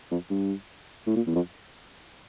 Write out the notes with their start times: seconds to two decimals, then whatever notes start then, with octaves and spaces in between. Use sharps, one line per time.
0.11 F2
0.30 G2
1.07 A2
1.16 A#2
1.27 E2
1.36 F2